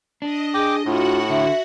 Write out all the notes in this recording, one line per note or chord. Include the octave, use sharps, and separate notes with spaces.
D4 D#5
G#4 G5 D6
A2 F4 F#4 F#5
D3 E5